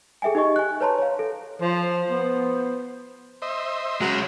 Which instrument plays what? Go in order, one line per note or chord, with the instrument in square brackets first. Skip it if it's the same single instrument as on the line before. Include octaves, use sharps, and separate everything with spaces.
[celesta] G#4 A4 E5 G5 G#5
D#4 G4 D#5 C#6
G#5 F#6
B4 C#5 A5 A#5 C6
C#5 F5
A4
[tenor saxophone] F3 [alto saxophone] C5
[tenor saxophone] B3
[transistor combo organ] C5 D#5 E5
[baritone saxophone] F#3 [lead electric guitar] G#3 C#4